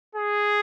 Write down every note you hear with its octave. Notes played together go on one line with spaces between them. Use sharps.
G#4